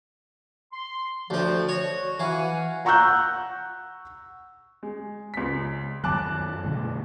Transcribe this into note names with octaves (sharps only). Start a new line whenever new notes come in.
C6
D2 F3 C4
F#4 C#5
E3 F5 F#5 G#5
F#5 A#5 C#6 E6 F#6 G6
G#3
C#2 B6
F#2 D#3 F#3 A5 D6 F#6
B2 D3 A3